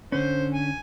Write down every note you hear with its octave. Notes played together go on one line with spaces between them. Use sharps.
D3 C#4 C5
G#5